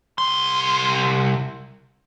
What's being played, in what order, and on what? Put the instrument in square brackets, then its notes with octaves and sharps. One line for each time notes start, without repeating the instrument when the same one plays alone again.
[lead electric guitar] C2 C6